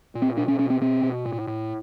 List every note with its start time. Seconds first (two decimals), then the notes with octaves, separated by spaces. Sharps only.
0.15 A#2
0.22 C4
0.37 B2 D4
0.48 C#4
0.59 B2 C#4
0.70 C4
0.81 B2 C4
1.03 B2
1.25 A2
1.47 A2